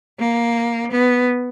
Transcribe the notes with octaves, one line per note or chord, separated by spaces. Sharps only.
A#3
B3